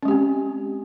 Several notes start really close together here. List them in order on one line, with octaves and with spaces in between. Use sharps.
C#4 G#3 G4 C4